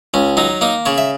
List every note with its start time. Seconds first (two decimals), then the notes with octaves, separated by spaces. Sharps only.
0.14 C#2 C#4
0.37 F#3 D#4
0.61 A#3 D#4
0.86 C#3 C#5
0.98 E5